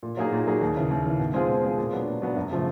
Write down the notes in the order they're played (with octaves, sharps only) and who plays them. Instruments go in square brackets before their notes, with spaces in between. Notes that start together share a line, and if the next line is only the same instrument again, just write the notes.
[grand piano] A#2
F#3 A#3 D#4 G#4
A#2
F#3 A#3 D#4 G#4
D#2
C#3 E3
D#2
C#3 E3
B2
G#3 C4 F4 G#4
B2
G#3 C4 F4 G#4
A#2
F#3 B3 D4
A#2
F#3 B3 D4
F#2
C#3 F3 A3